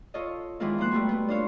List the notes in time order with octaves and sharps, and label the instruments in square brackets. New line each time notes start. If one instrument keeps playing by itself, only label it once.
[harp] F4 A4 C#5 D#5
D#3 E3 G#3 B3 C4 F4
F3 A#3 C5 F#6
G3 A3 B3 F#4
A3 B3
D4 F4 C5 C#5 F5